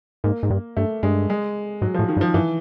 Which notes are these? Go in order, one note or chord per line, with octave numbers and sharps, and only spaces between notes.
G#2 A#3
G#2
G2
G2 A3
G2 G#3
G#3
G#2 F#3
F3
A2
D#3
G2
F3
G2 E3